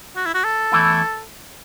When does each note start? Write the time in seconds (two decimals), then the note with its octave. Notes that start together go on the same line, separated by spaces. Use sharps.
0.16 F#4
0.26 E4
0.34 F#4
0.44 A4
0.72 E2 E3 A3 E4